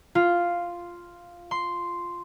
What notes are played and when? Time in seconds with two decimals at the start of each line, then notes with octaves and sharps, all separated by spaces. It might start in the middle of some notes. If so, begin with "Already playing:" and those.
0.15 F4
1.51 C6